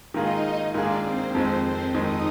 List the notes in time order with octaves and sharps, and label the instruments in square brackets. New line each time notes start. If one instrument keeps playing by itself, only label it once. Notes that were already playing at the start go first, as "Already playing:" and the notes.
[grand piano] G#2 D#3 A#3 F4 G#4 [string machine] D#4 D#5
[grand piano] G#2 D#3 A#3 F4 G#4 [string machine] D4 D5
[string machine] C4 C5
[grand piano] F2 D#3 G#3 [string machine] C4 C5
[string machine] C4 C5
[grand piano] F2 D#3 G#3 [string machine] D#4 D#5